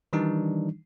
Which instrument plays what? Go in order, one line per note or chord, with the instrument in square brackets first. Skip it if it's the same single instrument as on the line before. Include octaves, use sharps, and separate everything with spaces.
[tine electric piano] D#3 E3 G3 D4 D#4